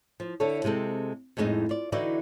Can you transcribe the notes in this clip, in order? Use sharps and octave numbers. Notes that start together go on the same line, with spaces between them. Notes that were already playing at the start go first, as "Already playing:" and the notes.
F3
D3 E4 A4 C#5
C3 G#3 C4 A4
F2 A2 G#3 B3 D#4
F4 D5
D3 E3 D#4 E4 F#4 D5